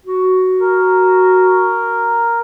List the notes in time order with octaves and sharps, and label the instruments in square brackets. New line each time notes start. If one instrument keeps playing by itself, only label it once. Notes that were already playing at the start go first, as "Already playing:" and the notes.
[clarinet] F#4
[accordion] A#4